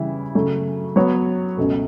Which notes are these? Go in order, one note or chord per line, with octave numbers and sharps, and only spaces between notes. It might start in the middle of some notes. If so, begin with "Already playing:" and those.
Already playing: C#3 E3 G3 C#4 E4
C#3 F#3 A3
F#3 B3 F#4 C#5
C#2 B2 A3